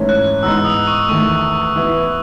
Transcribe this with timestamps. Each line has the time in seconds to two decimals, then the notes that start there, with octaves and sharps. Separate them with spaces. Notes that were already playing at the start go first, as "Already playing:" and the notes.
Already playing: G#2 E3 A3 C#4
0.09 F#6
0.43 G#2 E3 B3 D#4 E6
0.64 D#6
0.88 C#6
1.09 E2 D#3 A3 C#6
1.76 E3 B3 E4